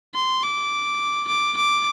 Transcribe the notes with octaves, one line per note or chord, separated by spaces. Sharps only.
C6
D6
D6
D6